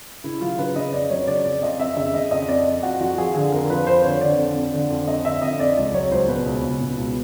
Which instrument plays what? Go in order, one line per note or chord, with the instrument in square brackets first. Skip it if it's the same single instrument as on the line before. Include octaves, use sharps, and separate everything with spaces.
[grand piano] C#3 E4
F#3 F4
C#3 B4
C#3 D#5
F2 D5
F#3 C#5
C#3 D5
F2 D5
F2 D#5
F2 E5
C#3 E5
C#3 D#5
F2 D#5
F2 D5
F2
F2 F#4
F3 F#4
F3 G#4
D3 G#4
F2 A#4
F3 B4
F2 C5
D3 C#5
D3 D5
F2
F2
D3
F2
F2 D#5
D3 E5
F2 D#5
F2 D5
C#2 D5
F#3 C#5
C#2 C5
B2 B4
C#2
C#2
B2
C#2